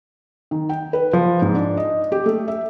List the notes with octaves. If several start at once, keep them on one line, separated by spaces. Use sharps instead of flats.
D#3
G5
B4
F3
G#2
D4
D#5
G4
A3
E5